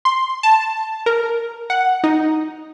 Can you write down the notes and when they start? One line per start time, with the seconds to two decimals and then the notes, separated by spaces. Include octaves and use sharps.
0.05 C6
0.43 A5
1.06 A#4
1.70 F#5
2.04 D#4